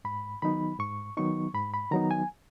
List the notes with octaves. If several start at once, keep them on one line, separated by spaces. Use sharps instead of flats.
G#2 B5
D#3 F#3 B3 D#4 B5
G#2 C#6
D#3 F#3 B3 D#4 C#6
G#2 B5
B5
D#3 F#3 B3 D#4 A#5
G#5